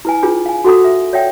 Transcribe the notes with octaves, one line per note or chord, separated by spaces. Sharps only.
E4 B4 G#5
D4 F4 G#4 B4
F5 G#5
F#4 A4 F#5 A#5 D#6
E5
C#5 D5 E5 F#5 G5